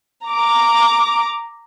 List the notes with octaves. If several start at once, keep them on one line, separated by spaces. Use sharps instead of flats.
A#5 D6